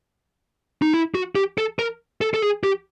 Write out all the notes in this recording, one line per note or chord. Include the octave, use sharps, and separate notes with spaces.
D#4
E4
F#4
G4
A4
A#4
A4
A4
G#4
G4